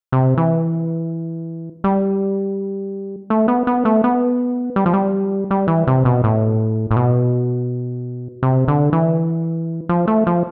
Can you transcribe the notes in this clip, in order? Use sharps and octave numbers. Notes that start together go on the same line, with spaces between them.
C3
E3
G3
A3
B3
B3
A3
B3
G3
F3
G3
G3
E3
C3
B2
A2
A2
B2
C3
D3
E3
F3
A3
F3